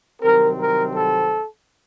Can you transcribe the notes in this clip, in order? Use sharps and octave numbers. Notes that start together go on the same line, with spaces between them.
C2 C3 D#3 F#3 C4 A#4
A#4
A4